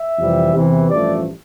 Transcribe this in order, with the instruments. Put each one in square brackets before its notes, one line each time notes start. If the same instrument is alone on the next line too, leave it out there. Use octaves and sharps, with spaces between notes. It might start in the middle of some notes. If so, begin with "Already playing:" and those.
Already playing: [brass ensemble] E5
F2 C3 E3 G3
E2 C3 E3
A1 G2 F3 A3 D5